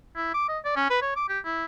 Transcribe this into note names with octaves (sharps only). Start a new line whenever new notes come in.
E4
D6
D#5
D5
C#4
B4
C#5
D6
G4
E4